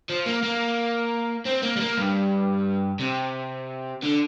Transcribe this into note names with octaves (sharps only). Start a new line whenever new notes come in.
F3
A#3
A#3
C4
A#3
G3
A#3
G2
C3
D3